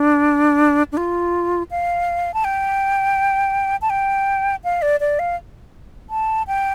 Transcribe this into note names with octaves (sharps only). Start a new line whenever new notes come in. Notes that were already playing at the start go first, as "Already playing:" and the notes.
Already playing: D4
D4
F4
F5
A5
G5
A5
G5
F5
D5
D5
F5
A5
G5